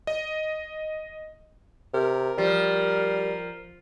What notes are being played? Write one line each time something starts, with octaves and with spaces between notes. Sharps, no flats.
D#5
C3 A#4
F3 G3